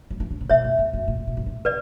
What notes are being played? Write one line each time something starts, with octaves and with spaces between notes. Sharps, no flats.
F#3
E3
D3
C#3
B2 C#5 E5
F#2
E2
F#2
A#2
B2
G2
A#2
C#3 B4 D5